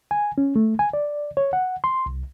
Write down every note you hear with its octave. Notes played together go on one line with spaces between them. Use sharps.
G#5
C#4
A3
G#5
D5
C#5
F#5
C6
C2